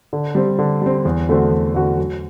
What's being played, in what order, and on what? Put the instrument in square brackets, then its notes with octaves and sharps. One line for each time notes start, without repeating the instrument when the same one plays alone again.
[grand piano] D3
G3 C4
D3
G3 C4
E2
D3 A3 C4 F#4
E2
D3 A3 C4 F#4
F#3